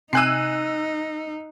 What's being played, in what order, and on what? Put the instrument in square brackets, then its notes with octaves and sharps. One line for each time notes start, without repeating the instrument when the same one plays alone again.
[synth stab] C3 G#5 D#7 [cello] D#4 [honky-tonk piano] E6 F#6 C7